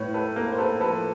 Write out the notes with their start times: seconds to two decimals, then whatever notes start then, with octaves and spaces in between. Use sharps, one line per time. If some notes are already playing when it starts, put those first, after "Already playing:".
Already playing: A2 B4 C#5
0.14 A4 B4
0.36 A#3 A#4
0.53 C5
0.58 A4 B4
0.80 F3 A4 B4